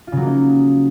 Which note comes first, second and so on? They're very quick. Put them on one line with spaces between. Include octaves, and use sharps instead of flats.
F4 C#3 F#3 A#3 D#4